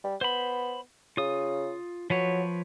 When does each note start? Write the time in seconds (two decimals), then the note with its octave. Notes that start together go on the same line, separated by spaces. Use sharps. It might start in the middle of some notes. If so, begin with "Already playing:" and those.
0.04 G3
0.21 B3 C5 B5
1.17 C#3 F4 D#6
2.10 F3 F#3 B4 C#5